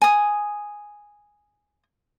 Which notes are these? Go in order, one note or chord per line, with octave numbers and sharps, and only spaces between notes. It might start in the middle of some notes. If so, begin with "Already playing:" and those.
G#5 D#6